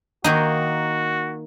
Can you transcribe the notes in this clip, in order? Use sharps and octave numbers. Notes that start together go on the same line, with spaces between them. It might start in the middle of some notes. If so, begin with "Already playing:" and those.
D#3 A#3 D#4 F#4